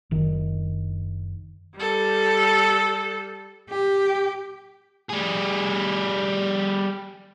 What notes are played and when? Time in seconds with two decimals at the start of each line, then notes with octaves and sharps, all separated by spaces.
0.11 F#1 D#3
1.76 G3 A4
3.70 G4
5.09 G3 G#4